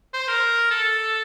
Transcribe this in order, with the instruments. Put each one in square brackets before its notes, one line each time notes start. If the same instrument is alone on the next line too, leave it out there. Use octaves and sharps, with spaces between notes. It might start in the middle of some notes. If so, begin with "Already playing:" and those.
[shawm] C5
A#4
A4